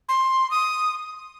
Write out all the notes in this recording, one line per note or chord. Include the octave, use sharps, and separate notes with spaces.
C6
D#6